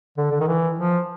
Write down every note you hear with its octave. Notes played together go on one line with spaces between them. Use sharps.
D3
D3
D#3
E3
F3